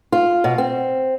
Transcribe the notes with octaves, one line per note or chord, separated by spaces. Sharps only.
F4
B2
C4